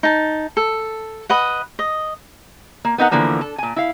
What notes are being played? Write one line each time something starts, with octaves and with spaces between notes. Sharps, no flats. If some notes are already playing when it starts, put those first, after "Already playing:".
D#4 A5
A4
B4 D#5 F#5
D#5
A#3
B3 D#4 A#4 F#5
D3 E3 F3 A#3 B3
A4
A#2 G#5
E4 F5